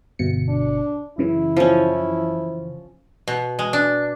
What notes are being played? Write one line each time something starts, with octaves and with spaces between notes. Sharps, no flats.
G1 B2 C#7
D4
F#2 C#3 E3 E4
F3 C#4
B2
G#3
D4